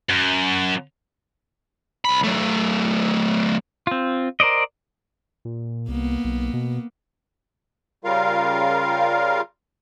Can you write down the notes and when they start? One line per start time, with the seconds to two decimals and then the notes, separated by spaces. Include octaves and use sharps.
0.09 F#2
2.05 C2 B5
2.24 F#3 A3
3.87 C4 F4
4.40 A#4 C5 D5 D#5
5.45 A#2
5.89 C2 A#3 B3
6.25 B1
6.53 B2
8.05 C#3 G3 F4 A#4 F5